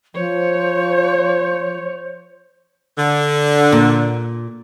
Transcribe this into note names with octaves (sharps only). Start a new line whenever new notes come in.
F3 C5 C#5
D3
A#2